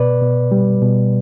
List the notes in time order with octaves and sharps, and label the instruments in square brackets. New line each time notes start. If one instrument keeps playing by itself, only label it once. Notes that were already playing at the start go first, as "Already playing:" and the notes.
Already playing: [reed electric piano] B2 B4 D5
B2
G3
B2